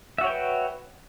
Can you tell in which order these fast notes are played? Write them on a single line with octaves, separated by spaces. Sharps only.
E5 F#4 C#5 G5 B4